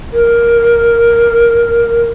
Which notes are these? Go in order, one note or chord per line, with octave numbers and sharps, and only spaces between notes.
A#4